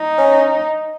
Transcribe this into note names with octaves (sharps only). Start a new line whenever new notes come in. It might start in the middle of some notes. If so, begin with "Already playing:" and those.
Already playing: D#4
C#4